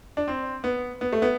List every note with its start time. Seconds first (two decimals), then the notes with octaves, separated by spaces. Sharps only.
0.17 D4
0.28 C4
0.64 B3
1.01 B3
1.13 A3
1.22 B3